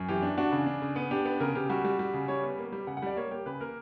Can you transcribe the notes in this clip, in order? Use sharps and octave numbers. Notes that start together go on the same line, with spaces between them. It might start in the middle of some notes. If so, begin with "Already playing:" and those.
Already playing: F#2
E3 G4
D4
D4 F#4
C#3
D4
C#3
B3
D4 G4
B3
C#3 A#4
C#3 G4
G3 F#4
G3
G3
C#3
G3 C#5
B3
A#3
G3
C#3 F#5
F#5
G3 D5
A#3 C#5
A#3 G4
C#3 B4
A#3 A#4